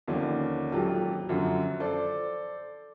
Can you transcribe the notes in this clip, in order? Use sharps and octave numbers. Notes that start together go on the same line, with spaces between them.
D#2 D3 F3 C#4 D4
D#1 G#1 F#3 F4 G4 A4
F#2 D3 F3
A4 C5 D5